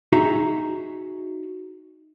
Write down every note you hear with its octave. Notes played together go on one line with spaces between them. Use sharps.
D#4 F#4 G#4 E5 A#5